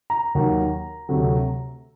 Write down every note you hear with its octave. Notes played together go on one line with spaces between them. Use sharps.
A#5
D#2 D#3 F#3 A#3
D2 C3 F#3 A3